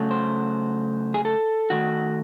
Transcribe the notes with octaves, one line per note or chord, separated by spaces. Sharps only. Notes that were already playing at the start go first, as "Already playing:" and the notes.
Already playing: C#3 F#3 A3
C5
G#4
A4
D#3 A3 F#4